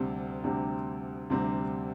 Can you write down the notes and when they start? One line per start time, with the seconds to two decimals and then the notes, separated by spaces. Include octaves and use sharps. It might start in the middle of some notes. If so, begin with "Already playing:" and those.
Already playing: D2 C3 G3 C4
0.44 D2 C3 G3 C4
1.30 D2 C3 G3 C4